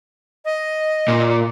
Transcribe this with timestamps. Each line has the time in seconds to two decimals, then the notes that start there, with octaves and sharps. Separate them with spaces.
0.45 D#5
1.08 A#2